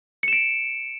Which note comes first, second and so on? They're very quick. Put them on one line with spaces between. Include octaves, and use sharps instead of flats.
C#7 E7 D7